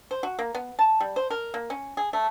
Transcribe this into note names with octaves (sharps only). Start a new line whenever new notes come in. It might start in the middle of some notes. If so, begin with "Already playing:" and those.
C5
F#4
A#3
B3
A5
G3
C5
A#4
A#3
C#4
G#4
A3